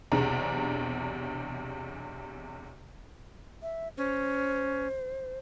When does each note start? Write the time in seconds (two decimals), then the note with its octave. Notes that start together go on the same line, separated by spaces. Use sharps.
0.12 B1 E2 C3 D4 G#4 A#5
3.62 E5
3.97 C#4 C5